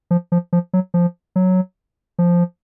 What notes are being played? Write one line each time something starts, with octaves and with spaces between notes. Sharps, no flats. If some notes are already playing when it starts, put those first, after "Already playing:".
F3
F3
F3
F#3
F3
F#3
F3